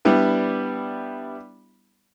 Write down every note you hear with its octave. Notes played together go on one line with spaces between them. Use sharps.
G3 B3 D4 E4